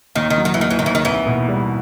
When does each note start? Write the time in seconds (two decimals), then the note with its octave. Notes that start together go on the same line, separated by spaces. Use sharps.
0.16 D#2 D#3
0.30 D#3
0.38 F#3
0.45 D#3
0.54 E3
0.59 D#2 D#3
0.71 E3
0.79 D#3
0.82 D#2 E3
0.95 D#3
1.05 C2 E3
1.26 B2
1.48 G3